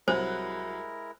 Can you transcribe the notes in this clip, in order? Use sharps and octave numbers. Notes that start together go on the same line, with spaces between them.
C2 F#3 G#3 E4 A#4 C5 F#6